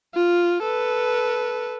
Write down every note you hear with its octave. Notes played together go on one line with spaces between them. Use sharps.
F4
A4 B4